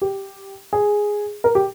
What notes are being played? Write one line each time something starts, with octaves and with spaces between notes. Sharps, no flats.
G4
G#4
A#4
G4